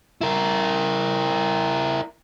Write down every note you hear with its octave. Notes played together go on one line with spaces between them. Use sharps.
E4 A#4